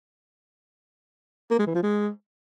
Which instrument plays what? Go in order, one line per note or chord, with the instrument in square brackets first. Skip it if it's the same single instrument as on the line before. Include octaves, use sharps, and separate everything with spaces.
[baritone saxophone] A#3
G#3
E3
F3
G#3